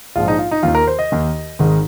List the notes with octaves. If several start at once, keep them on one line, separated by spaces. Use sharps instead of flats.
A#1 G#2 F3 F4
D#4
F4
D#4
D#2 F4
D#3
A#4
C5
D#5
D#2 D#3
G#1 G#2 D#3